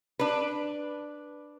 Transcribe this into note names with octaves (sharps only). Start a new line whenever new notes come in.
D4 B4